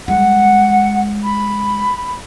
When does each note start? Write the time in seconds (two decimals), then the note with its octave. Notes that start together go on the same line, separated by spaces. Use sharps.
0.08 G3 G#3 F#5
1.24 B5